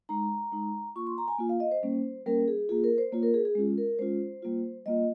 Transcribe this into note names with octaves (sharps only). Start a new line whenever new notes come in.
G#3 D#4 A#5
G#3 D#4
A#3 F4 C#6
C6
A#5
G#5
A#3 F4
F5
D#5
C5
G3 A#3 C#4
G3 A#3 C#4 A#4
G#4
A#3 F4 G#4
A#4
C5
A#3 F4 C#5
A#4
G#4
G#4
G#3 C#4 F4
A#4
G#3 C#4 F4 C5
G3 A#3 F4
G3 A#3 F4 D#5